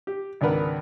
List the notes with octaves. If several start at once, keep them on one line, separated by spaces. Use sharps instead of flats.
G4
G#1 C#2 D4 A#4 B4 F#5